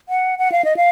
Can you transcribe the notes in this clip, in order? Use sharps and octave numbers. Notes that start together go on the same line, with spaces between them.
F#5
F#5
F5
D#5
F5